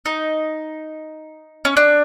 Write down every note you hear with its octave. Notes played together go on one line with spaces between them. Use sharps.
D#4
C#4
D4